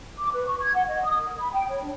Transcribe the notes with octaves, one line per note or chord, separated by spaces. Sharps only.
D6
B4
C#6
G#6
F#5
D#5
D#6
A#4
B5
G5
C#5
D4